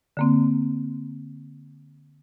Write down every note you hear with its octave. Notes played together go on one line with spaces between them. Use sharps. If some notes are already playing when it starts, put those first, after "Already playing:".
D3 A#3 C4